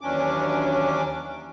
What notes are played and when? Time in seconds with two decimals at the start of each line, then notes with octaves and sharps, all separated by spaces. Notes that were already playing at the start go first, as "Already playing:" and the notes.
0.01 D#2 E3 F#3 C#4 D4 D6